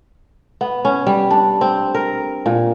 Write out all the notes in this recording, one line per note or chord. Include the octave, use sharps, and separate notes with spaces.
B3
C#4
G3
D4
C4
A#4
A#2